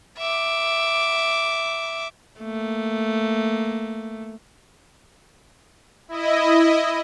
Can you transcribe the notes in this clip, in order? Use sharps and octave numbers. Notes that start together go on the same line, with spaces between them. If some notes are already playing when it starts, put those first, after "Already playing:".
E5 D6
A3 A#3
E4 D#5